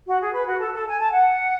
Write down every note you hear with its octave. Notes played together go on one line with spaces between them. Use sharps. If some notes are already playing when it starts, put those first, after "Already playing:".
F#4
G#4
B4
F#4
A4
A4
G#5
A5
F#5